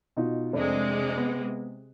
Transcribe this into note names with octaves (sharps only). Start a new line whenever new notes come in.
B2 D#4 F4
F1 C3 G#3 D4
B3